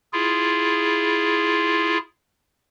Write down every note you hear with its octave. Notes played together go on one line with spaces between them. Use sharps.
E4 F4 G#4